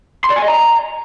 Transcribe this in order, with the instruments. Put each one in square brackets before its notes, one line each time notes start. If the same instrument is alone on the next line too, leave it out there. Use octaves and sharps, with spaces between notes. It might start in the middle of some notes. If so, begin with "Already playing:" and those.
[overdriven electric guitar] C6
D5
G#5
D#5
A#5